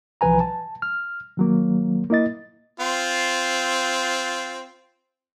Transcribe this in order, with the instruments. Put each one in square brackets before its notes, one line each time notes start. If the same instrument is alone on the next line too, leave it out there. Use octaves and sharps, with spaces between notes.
[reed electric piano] C2 E3 F3 B4 G#5 A#5
A5
F6
D#3 F#3 A#3
A#3 E4 D#5 A6
[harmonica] C4 F4